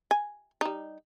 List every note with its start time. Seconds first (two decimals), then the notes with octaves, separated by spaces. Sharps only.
0.11 G#5
0.61 G3 D#4